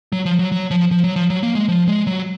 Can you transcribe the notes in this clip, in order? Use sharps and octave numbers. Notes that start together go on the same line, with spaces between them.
F#3
F3
F#3
F#3
F3
F3
F#3
F3
F#3
A#3
G#3
F3
G#3
F#3